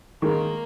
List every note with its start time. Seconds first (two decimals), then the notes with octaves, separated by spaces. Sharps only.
0.22 D#3 G#3 A#3